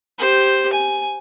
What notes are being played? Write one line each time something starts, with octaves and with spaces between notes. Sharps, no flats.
G4 C5
G#5